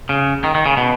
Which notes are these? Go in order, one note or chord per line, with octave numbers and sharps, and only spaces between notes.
C#3
D#3
D#3
C#3
B2